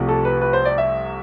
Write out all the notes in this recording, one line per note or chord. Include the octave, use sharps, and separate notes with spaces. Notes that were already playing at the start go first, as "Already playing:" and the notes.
Already playing: C2 C3 F3 A3
A4
B4
B4
C5
D5
E5